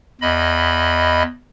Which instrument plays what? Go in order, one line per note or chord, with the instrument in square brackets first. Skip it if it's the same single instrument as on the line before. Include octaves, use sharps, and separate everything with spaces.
[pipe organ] E2 D#5 B5